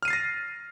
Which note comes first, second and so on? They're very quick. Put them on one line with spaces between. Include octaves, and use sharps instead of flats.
F6 D#7 C7 A6 A#6